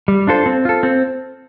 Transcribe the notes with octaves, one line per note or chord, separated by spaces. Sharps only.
G3
D4 F4 A4 C5
C4
F4 A4
C4